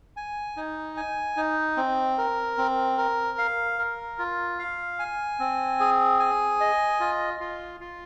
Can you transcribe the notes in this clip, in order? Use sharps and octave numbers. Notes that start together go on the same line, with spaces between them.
G#5
D#4
G#5
D#4
C4
A#4
C4
A#4
F5
A#4
F4
F5
G#5
C4
G#4
G#5
D#5
F4
F4
F4